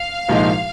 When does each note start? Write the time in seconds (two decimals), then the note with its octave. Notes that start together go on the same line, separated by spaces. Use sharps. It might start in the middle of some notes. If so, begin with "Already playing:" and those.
Already playing: F5
0.29 C2 A#2 F3 G#3 D#4